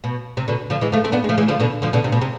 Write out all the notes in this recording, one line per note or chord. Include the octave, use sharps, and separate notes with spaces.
B2
C3
B2 D3
D3 F3
E3 G#3
F3 A3
A3 C4
B3 D4
G#3
F3 A3
E3 G#3
D3 F3
B2 D3
D3 F3
B2 D3
C3
B2
C3